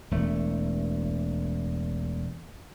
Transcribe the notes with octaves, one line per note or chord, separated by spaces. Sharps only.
E1 A3